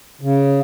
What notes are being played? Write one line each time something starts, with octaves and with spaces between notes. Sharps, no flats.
C#3